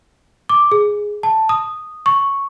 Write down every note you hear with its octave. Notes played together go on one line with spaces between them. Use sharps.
D6
G#4
A5
D#6
C#6